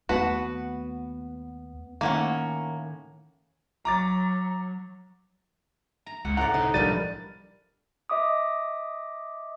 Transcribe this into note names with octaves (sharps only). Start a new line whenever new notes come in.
D#2 A3 B3 F#4 B4 F#5 A5
A2 D#3 A3 A#3 C#4 F#5
F#3 A#5 D6 A6
A#5
C#2 F#5
A2 D5 F#5 A#5
C3 D#4
B1 F3 G3 D4 A#4 B4 A6 D#7
D#5 E5 D6 D#6